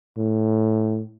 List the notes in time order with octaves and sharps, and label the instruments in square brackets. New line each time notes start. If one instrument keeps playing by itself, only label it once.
[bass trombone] A2